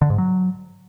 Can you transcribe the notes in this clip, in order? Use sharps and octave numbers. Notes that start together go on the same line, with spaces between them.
D3
G#2
F#3